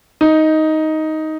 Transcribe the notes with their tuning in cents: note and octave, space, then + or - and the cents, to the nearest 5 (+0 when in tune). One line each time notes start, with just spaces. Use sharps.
D#4 +10